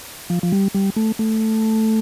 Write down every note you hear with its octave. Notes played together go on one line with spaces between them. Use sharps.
F3
F3
G3
G3
A3
A3